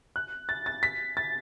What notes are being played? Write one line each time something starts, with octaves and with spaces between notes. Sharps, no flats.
F#6
A6
A6
B6
A6